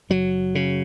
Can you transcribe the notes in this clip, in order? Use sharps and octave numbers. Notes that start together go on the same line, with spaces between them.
F#1 F#3
C#3